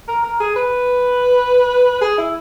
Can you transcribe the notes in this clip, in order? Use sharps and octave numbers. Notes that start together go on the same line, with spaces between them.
A#4
A#4
G#4
B4
G#4
E4